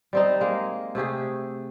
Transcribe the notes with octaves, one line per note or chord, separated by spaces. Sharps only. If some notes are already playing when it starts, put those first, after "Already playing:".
G3 C4 D#4
G#3 A#3
C3 A3 G4 G#4